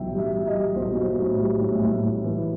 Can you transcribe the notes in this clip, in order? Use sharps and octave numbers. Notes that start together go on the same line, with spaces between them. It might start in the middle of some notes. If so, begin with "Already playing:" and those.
Already playing: B1 A2 E3 E5 G5
G3
E5
G3
D#5
G3
B1 C5
B1
A2
G3
A2
A2
A2
E3